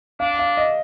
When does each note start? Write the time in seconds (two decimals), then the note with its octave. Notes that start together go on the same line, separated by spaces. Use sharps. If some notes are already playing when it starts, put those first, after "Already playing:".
0.20 D4 F5
0.39 F5
0.57 D#5